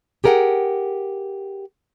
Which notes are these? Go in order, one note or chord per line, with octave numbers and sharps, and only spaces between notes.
G4 G#4 A#4 D5 F#5 G5